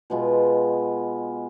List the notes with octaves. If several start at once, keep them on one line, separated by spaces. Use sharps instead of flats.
B2 G#3 B3 F4